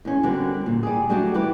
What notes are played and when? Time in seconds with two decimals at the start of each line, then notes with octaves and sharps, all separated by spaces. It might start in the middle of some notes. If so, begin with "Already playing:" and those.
0.05 E2 C#4
0.23 D3 G3 C4 F#4 A#4
0.66 A#2
0.83 G3 G4 G#4
1.09 F#3 G3 A3 D4 F#4
1.34 E3 G4 B4